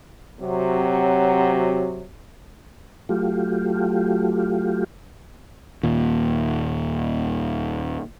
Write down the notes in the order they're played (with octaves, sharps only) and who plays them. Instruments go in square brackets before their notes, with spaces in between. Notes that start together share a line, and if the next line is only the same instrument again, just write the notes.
[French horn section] C3 F#3
[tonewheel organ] F#3 A3 F4 G4
[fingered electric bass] D#2 A#2